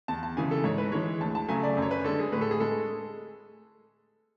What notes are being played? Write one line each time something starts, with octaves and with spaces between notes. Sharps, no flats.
E2 A5
A5
C#3 E3 G#3 G#5
A4
G#2 C#5
B4
E3 G#3 C#5
D2 A5
A5
C#3 F#3 A3 G#5
D5
F#2
C#5
B4
D3 G#3 A4
G#4
A2 B4
A4
G#4
G#3 A4